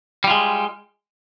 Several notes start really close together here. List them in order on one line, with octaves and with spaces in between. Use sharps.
G3 F4 G#3